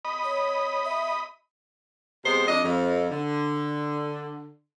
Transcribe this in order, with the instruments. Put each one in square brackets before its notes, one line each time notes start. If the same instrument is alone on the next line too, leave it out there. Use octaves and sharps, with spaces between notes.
[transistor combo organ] D#5 B5 D#6
[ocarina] C#5
E5
[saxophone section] C3 G#3 B3 C5
F2 D4 D#5
F2
D3